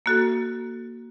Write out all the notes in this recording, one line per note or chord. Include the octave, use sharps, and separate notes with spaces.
A#3 F#4 A4